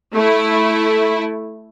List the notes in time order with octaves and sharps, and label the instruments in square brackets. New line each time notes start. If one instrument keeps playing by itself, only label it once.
[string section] A3 E4